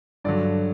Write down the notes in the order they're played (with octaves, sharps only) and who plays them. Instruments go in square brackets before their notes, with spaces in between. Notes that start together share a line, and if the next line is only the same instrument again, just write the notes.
[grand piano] G2 D3 F#3 D5